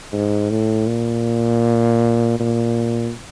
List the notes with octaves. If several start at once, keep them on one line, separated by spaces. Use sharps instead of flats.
G#2
A2
A#2
A#2